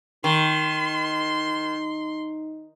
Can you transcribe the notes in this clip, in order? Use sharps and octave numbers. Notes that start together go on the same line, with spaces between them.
D#3 D#4 C6